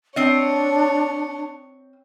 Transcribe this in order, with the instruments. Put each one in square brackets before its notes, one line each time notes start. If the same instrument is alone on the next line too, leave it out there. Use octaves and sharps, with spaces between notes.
[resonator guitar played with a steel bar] C4 D#5 [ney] D4 [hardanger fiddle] C#5